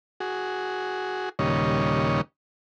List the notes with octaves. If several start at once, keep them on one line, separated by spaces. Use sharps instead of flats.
F#4 G#4
D#2 A#2 C#3 G3 C#5 D#5